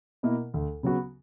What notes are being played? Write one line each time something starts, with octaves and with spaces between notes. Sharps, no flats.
B2 A#3 E4 A#4
D2
C#3 F#3 B3 F#4